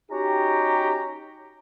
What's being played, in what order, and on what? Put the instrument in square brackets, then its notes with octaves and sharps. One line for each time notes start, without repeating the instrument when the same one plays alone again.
[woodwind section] C#4 F#4 A#5 [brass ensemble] D#4 G4